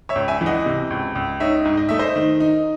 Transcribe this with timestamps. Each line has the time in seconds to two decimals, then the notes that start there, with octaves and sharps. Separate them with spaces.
0.09 C#5 E5
0.16 C#2
0.28 E5 G#5
0.41 E3
0.46 D#5 F#5
0.66 C3
0.91 C#2
1.15 C#2
1.40 D#4 C#5 E5
1.65 G#2
1.77 D#5
1.89 A3 E5
1.99 C5 D#5
2.16 D#3
2.40 D#4